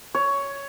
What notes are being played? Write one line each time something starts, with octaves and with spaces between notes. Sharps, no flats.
C#5